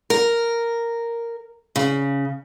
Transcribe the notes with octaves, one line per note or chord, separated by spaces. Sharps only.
A#4
C#3